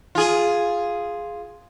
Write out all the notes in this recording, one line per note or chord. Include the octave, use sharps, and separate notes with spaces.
F4 G#4